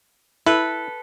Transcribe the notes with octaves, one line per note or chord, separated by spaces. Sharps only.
E4 A4 B4